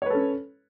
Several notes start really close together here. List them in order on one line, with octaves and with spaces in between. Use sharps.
C#5 B4 A4 C#4